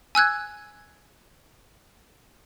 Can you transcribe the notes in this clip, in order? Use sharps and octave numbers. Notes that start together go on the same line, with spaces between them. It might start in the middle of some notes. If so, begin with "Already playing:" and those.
G#5 E6 F#6 G#6